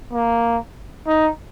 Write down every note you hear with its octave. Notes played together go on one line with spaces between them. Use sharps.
A#3
D#4